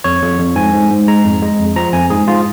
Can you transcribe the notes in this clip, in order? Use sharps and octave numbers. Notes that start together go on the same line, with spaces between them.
F2 C#5
F2
F2
G#2 G#5
G#2
G#2
G#3 A#5
F2
G#3
F2
F3 A#5
F2 G#5
G#2 G#4
G#2 F4